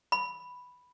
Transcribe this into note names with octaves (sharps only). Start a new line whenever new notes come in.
B5